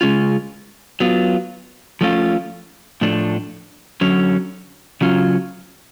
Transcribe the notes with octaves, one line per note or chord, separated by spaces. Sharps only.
C#3 G#3 C#4 F4
F#3 B3 F4
F3 A3 C#4 F4
A2 F3 A3 D4
D3 F#3 C#4
C#3 F#3 C#4 F4